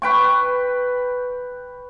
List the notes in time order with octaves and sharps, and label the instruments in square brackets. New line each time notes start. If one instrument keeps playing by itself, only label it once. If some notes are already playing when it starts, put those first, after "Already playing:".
[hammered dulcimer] B4 G5 C#6